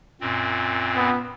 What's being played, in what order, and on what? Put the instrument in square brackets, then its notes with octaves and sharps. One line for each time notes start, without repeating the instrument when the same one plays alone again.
[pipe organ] F#2 A#2 C4
[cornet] B3